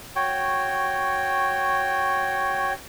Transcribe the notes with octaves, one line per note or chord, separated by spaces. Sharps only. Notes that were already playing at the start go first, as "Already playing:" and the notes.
F#4 C#5 G5